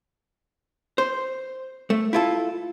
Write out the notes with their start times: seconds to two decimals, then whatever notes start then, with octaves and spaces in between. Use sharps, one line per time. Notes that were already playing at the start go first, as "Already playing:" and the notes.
0.98 C5
1.90 A3
2.13 E4 F4 A4